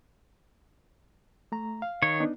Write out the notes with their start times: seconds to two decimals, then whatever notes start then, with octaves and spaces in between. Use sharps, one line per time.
1.52 A3 A#5
1.82 F5
2.02 D#3 C#5
2.20 B3 D4 D#4